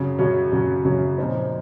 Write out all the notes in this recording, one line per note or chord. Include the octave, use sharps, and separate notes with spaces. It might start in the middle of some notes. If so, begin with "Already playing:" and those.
Already playing: F#2 C#3 F#3 C#4
F#2 C#3 F#3 C#4
F#2 C#3 F#3 C#4
F#2 C#3 F#3 C#4
A#2 F3 C4 D#4